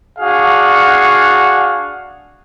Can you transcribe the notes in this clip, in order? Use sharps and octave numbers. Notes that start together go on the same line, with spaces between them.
D4 F#4 G#4 F5 F#5